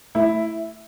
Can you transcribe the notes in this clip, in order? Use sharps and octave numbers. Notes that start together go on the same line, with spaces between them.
A3 E4